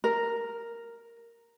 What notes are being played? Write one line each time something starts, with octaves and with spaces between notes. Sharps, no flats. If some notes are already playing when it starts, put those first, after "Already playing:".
A#4